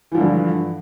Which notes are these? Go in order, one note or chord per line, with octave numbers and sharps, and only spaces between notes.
G2 D3 E3 F3